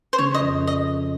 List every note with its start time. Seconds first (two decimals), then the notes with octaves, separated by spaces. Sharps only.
0.13 C5
0.18 C#3 C#5
0.34 D#5
0.40 F2
0.67 D#5